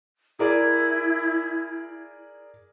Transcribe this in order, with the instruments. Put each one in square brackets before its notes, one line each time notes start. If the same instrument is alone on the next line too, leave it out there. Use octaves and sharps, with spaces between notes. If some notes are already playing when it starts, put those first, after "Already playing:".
[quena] E4 [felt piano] G#4 A#4 D5